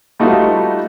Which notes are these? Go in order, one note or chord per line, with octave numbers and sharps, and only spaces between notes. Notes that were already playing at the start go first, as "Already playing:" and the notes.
G3 A3 B3 D#4 F4 F#4